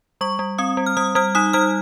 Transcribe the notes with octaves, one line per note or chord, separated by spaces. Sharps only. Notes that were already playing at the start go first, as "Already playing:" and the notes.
G3 C#6
G3
C4 D#6
G3
F6
G3 D#6
G3 F6
D#4 D#6
G3 F6